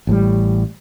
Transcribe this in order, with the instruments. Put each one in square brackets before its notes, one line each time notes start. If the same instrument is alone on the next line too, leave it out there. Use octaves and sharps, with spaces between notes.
[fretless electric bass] A1 A2 G3